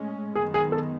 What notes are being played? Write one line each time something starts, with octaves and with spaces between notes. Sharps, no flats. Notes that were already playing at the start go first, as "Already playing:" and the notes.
Already playing: A2 G#3 C#4
F#2 D#3 G#3 B3 G#4
G#4
A4